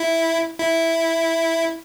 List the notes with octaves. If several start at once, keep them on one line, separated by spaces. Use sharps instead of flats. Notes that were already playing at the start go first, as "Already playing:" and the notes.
Already playing: E4
E4